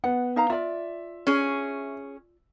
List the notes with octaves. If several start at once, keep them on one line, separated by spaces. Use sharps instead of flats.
B3 F#5
D#4 F5 A#5
F4 D5 E5
C#4 G#4